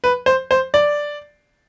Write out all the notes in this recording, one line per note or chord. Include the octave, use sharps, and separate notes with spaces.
B4
C5
C5
D5